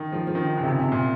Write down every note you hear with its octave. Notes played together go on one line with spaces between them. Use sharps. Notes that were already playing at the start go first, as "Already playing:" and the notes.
Already playing: D#3
F3
F3
D#3
D#3
C#3
C3
C#3
C3
A#2